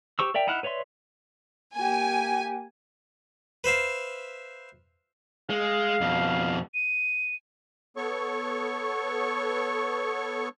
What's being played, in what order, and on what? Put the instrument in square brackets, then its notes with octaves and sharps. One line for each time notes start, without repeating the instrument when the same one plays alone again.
[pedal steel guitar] G4 C5 C#6 E6
A#4 D5 E5 G5
D#4 E4 F#5 F6 F#6
B4 C#5 D5 E5 C6
[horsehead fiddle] A#3 G4 [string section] G#5
[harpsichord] B4 C5 E5 F5
[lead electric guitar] G#3 [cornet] F5
[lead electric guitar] F2 B2
[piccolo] D#7
[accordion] B3 A4 C#5 C#6